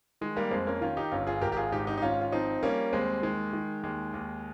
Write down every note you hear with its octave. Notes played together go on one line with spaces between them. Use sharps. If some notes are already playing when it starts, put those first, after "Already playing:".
D#3 G#3
G3 A#3
F2 G#3 C4
A#3 C#4
D#3 C#4 F4
D#4 G4
G1 C#4 F4
F4 G#4
G#1 G4 A#4
G4
F4 G#4
G#2 D#4 G4
D#4 G4
D#4
G#1 C#4 F4
F4
F3 C4 D#4
G3 A#3 C#4
D#2 G#3 C4
D#3 G#3
D#3
D#2 G#3
D#2